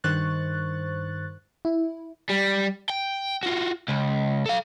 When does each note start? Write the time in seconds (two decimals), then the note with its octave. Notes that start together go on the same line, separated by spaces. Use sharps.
0.04 G2 D#3 C5 C#6 F#6 A6
1.65 E4
2.29 G3
2.89 G5
3.43 F4 F#4
3.88 C#2
4.46 A4 F5